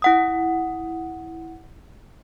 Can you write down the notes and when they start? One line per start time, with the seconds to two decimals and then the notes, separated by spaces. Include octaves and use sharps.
0.02 E4 F#5 D#6